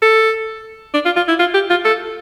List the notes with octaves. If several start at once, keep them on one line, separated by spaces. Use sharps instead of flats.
A4
D4
F4
F4
E4
F4
G4
F4
A4